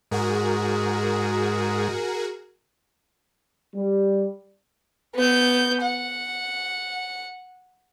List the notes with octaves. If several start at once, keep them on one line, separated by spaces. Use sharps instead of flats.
G#2 F#4 G#4 A#4
G3
B3 G6
F#5